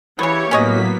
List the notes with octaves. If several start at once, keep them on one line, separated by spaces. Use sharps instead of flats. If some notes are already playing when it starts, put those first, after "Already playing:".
C#3 E3 B3 G4 C#5
A2 F#3 A#3 B3 C#4 C#5 D#5 B6